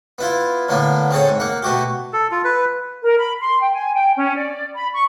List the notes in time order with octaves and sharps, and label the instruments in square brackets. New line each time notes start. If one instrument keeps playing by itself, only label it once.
[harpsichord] B3 E4 F4
A2 D3 A#3 B3
C4 G#4 A4 C#5
G#2
A#3 F#5
B2 A3 F#4 G4
[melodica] A4
F4
B4
[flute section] A#4
B5
C6
G5
G#5
G5
C#4
D5
B5
C#6